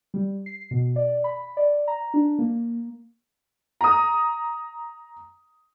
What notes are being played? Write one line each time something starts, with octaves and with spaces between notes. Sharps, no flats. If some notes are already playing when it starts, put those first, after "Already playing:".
G3
C7
B2
D5
B5
D5
A#5
D4
A#3
A#5 D#6